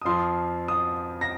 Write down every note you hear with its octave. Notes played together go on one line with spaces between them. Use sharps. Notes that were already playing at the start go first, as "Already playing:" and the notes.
D#6
F2 F3 C6
D#6
A#6